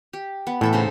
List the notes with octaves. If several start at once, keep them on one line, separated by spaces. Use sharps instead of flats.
G4
B3
A2 E3 A4 E5
C#3 D#4 C5